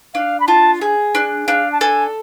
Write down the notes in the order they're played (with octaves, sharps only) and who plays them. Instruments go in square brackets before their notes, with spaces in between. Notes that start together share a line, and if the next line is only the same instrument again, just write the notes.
[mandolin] D4 [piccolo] F5
[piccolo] B5
[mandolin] F4 [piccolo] A5
[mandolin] G#4
D4
[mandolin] D4 [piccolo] F5
[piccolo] A5
[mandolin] A4 [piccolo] G#5